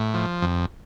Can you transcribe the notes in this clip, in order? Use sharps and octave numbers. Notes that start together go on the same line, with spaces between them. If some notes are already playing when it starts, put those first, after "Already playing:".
Already playing: A2
F3
F2